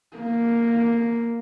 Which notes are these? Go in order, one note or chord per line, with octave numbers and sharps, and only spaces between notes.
A#3